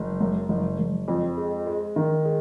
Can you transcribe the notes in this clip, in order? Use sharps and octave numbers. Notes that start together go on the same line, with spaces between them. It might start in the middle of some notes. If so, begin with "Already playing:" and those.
Already playing: F#1
F#2
F#1
F#1
F2
G#3
G#3
D#3
G#3